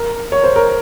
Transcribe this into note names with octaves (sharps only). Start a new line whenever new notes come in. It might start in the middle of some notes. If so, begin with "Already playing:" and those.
Already playing: A#4
C#5
C5
A#4